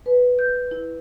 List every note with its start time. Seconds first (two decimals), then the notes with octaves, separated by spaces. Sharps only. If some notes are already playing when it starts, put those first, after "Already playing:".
0.06 B4
0.39 G6
0.71 E4